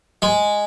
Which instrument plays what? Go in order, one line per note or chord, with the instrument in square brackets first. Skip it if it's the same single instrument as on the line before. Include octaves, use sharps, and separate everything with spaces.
[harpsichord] G#3